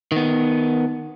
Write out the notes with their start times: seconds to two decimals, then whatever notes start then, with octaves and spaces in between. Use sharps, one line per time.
0.12 D#3 B3